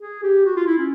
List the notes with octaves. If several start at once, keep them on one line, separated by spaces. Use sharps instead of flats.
G#4
G4
F#4
F4
E4
C#4